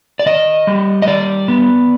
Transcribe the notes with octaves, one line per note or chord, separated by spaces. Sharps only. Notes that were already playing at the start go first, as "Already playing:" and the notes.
D5
D#3 D#5
G3
D#5
D#3 D5
B3